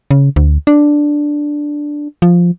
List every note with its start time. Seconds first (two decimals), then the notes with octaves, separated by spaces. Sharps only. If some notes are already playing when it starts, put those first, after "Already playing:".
0.11 C#3
0.36 D2
0.67 D4
2.22 F3